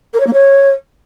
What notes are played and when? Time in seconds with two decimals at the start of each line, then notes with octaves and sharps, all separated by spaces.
0.14 A#4
0.20 C#5
0.27 A#3
0.33 C#5